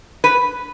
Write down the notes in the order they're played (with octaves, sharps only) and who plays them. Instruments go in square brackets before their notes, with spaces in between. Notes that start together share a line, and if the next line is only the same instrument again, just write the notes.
[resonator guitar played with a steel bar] B4